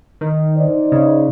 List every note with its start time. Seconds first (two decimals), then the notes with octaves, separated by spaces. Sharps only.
0.21 D#3
0.56 D#4 C5 D5
0.92 C#3